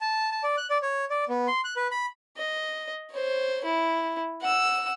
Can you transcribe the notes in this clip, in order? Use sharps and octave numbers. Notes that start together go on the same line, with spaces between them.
A5
A5
D5
F#6
D5
C#5
D5
B3
C6
F#6
B4
B5
D#5
C5 C#5
E4
F#5 E6